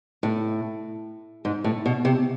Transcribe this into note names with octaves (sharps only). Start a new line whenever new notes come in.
A2
G#2
A2
B2
C3